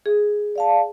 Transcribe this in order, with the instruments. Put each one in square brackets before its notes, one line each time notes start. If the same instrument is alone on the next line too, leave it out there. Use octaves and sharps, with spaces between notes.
[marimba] G#4
[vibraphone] D5 F5 A5